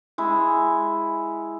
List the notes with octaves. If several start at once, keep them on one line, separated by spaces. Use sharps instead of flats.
G#3 E4